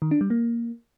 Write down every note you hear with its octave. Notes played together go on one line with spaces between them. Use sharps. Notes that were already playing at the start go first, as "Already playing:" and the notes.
D#3
D4
G3
A#3